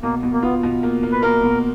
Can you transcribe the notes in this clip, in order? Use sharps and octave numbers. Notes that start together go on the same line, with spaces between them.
B2 A#3
B2
A#3
B3 F4
B2
A#3
A#3
B4
A#3 A#4
B2